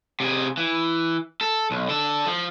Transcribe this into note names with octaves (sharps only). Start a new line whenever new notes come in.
C3 G#4
E3
A4
B1
D3 A4
F3